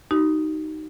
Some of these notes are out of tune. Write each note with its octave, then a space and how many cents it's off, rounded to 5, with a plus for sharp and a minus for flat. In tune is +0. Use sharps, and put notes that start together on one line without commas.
D#4 +0 F#4 +45